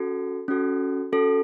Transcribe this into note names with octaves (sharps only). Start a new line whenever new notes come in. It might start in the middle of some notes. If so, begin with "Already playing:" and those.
Already playing: C#4 F#4 A4
C#4 F#4 A4
C#4 F#4 A4